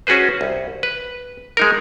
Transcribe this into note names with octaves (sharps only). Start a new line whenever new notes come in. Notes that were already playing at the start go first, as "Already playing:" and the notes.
C#4 F#4 G#4 B4 C5
C2
B4
G#3 D#4 A#4